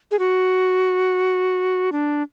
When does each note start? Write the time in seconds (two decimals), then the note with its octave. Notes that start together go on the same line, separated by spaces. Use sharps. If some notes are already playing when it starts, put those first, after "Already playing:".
0.11 G#4
0.19 F#4
1.92 D4